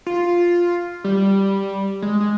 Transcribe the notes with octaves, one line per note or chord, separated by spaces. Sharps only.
F4
G3
G#3
G#3